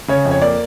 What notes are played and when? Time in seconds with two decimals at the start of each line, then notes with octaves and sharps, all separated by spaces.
0.08 C#3 C#5
0.25 F2
0.31 C#5
0.42 A#3 D5